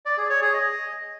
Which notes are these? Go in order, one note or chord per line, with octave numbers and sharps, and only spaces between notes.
D5
G#4
C#5
G#4
D#5